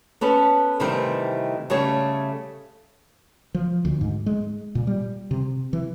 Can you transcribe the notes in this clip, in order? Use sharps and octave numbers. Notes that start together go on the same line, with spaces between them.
B3 C#4 A4 B4
C3 D#3 E3 G3 A3 C4
C#3 G3 A3 C#5
F3
D2
G#2
G#3
A#2
G3
C3
E3